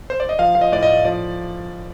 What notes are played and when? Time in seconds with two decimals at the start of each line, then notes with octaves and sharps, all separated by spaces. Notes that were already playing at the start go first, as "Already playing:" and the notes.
0.10 C5
0.20 D5
0.29 D#5
0.39 F3 F5
0.55 F3 F5
0.61 D#5
0.72 A2 D5
0.83 D#5
0.88 A2
1.05 F3 D5